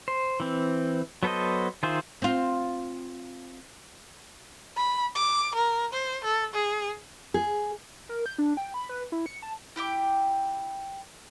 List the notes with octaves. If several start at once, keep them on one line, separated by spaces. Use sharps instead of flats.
C5
E3 C4
F#3 B3 A4 C5 D#5
D#3 F4 G#4 C5 E5
C4 F4
B5
D6
A#4
C5
A4
G#4
G#4
A#4
G6
D4
G5
B5
B4
E4
C#7
A5
E4 G4 G5 D6